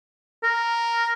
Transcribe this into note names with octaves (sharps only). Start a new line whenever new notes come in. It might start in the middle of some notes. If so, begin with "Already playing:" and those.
A#4